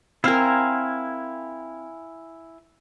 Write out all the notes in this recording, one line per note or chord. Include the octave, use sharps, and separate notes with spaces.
C4 E4 A#4 F5 G#5